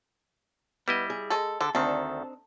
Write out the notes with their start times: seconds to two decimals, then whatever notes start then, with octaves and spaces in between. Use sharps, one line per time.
0.88 G3 B3 E4 D#5
1.10 G#4
1.30 G#3 A4
1.61 D3 A4
1.75 D2 D#3 C4 D4 D#4 A4